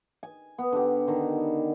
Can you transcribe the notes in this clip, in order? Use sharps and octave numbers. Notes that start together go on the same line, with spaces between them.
G#5
B3
D3 G4
D3 D#3